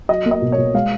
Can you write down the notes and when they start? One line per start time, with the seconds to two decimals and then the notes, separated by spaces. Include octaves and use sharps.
0.09 F#3 D#5
0.26 A#3
0.31 D#5
0.42 B2
0.52 C#5
0.58 B2
0.74 G#3 F5